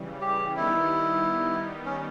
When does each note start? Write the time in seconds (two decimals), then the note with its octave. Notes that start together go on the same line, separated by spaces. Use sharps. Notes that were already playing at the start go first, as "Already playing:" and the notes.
Already playing: C#3 E3 G3
0.21 G4
0.56 D#3 G3 B3 D#4 E4
1.86 C#4